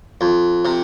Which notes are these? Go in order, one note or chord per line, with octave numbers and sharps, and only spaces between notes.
F2
C3